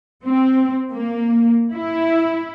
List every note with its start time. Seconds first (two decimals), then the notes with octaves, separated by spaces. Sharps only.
0.24 C4
0.91 A#3
1.74 E4